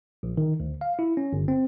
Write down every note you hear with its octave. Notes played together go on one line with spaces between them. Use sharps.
A#1
D#3
D2
F5
E4
C#4
G1
C4